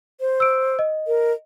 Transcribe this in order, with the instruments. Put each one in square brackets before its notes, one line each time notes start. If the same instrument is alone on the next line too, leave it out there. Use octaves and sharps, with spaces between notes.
[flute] C5
[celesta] E6 D7
D#5
[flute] A#4